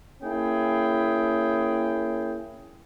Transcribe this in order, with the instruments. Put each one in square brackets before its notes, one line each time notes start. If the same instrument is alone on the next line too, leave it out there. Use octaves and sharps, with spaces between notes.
[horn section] A#3 C#4 E4 G#4 G5